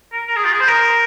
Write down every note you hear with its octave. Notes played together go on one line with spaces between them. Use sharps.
A#4
A#4
G#4
F4
G#4
C5
A#4